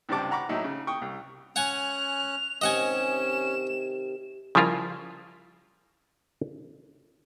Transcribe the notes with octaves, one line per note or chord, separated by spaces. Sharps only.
C#2 G2 C3 C4 A5 D6
F#5 A#5 B5 C#6 D6
A2 F#3 D#4 E4
C#3
G5 C#6 D#6
C2
C#4 F#5 G#5 F#6 F7
C3 D#3 C#4 D#5 F#5 G#5 E7
C#3 F3 G3 E4 F4 A#4